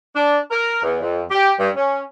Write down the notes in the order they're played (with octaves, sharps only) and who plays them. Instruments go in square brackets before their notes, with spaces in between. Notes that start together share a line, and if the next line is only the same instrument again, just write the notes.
[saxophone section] D4
A#4
E2
F2
G4
G2
C#4